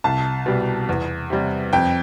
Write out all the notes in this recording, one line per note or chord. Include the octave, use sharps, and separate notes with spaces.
C2 A5
B2 G3
E2
C3 G3
F2 G5